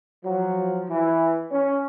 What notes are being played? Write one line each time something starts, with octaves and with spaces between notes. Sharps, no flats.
F3 F#3
E3
C#4